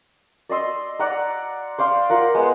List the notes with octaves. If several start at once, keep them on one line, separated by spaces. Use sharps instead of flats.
D5 D#5 C6 E6
D5 F#5 A#5
C5 D5 F5 C6
F4 A#4 F#5
G#3 B3